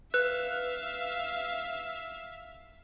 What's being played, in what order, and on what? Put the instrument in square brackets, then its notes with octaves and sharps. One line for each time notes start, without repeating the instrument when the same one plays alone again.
[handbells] B4 F#6 [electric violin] E5 F5